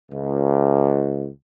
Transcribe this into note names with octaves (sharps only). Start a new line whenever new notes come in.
C#2